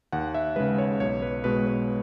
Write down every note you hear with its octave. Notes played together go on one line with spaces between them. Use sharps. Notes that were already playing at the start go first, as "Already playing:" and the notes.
D#2 F#5
E5
C#3 G#3 B4
C#5
B1 C#5
B4
B2 G#3 B4
B4